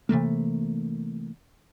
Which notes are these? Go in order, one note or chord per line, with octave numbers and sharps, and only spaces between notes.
C3 E3 A3 A#3